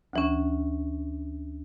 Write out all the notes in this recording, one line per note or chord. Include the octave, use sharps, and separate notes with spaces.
D2 E3 C#4